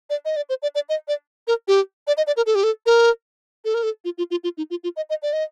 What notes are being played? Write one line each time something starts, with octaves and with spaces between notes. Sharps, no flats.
D5
D#5
D5
C5
D5
D5
D#5
D5
A#4
G4
D5
D#5
D5
A#4
A4
G4
A4
A#4
A4
A#4
A4
F4
F4
F4
F4
D#4
F4
F4
D#5
D#5
D5
D#5